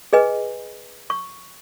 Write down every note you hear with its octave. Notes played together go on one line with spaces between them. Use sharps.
G#4 B4 D#5 G#5
C#6